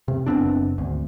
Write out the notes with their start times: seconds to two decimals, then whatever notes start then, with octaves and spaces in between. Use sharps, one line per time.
0.08 C3
0.26 F#1 B3 C4 D4
0.78 G#1 D2